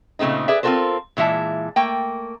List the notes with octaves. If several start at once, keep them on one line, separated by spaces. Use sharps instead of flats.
A#2 C#3 A3 C4 D#4
G#4 B4 D5 E5
C4 F4 F#4 A4 A#4 C5
A#2 E3 G#3 E5 A5
A3 A#3 G5